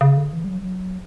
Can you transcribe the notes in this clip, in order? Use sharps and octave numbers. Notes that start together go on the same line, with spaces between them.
C#3
D3
E3
G3
F#3
G3
F#3